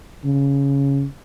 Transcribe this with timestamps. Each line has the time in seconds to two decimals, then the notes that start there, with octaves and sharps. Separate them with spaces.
0.24 C#3